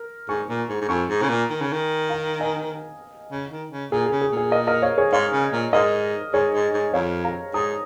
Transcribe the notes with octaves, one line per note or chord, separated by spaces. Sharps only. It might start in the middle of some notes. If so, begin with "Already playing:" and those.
Already playing: A#4
G#2 G#5 C#6
A#2
G#2
G#2
F2 G#5 C#6
G#2
C#3
A#2
D#3
C#3
D#3
F5 A#5
D#5 G#5
C#3
D#3
C#3
A#2 G#4
G#4
C#3
G#4
A#2 G#4
A#4 D#5
A#4 D#5
C#5 F5
G#4 C#5
G#2 C#5 F5
C#3
A#2
G#2 A#4 D#5
G#2 G#4 C#5
G#2
G#2
F2 C#5 F5
F5 A#5
G#2 A#5 D#6